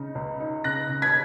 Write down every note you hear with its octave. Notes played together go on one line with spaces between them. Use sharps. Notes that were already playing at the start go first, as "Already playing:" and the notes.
Already playing: C#3 D#4
C#2
D#4
C#3 F#6 A#6
C#3
G#6 B6